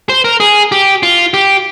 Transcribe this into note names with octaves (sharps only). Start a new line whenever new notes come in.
C5
A#4
G#4
G4
F4
G4